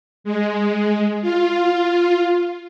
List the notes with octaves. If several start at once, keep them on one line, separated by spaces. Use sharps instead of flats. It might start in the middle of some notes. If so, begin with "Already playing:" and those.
G#3
F4